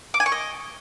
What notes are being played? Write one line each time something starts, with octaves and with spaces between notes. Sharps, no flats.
D6
G#5
C#6
D#5